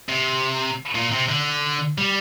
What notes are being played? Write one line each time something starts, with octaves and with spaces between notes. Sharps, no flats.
C3
A#2
C3
D3
G3